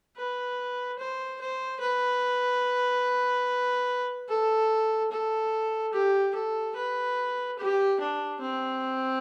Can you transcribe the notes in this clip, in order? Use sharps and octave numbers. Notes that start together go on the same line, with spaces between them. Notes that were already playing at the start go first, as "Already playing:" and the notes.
B4
C5
C5
B4
A4
A4
G4
A4
B4
G4
D4
C4